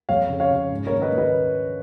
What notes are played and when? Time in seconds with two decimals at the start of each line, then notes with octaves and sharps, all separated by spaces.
0.09 F2 C#5 F5
0.29 C#3
0.40 C#5 F5
0.51 C#3
0.71 G#2
0.87 A#4 C#5
0.92 D#3
1.02 B4 D#5
1.12 D#3
1.18 B4 D#5